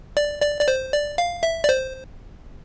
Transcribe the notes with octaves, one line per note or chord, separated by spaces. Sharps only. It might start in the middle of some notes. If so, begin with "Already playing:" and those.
D5
D5
D5
C5
D5
F5
E5
D5
C5